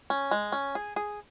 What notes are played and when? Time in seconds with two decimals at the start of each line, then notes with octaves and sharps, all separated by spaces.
0.10 C#4
0.31 G#3
0.52 C#4
0.75 G#4
0.96 G#4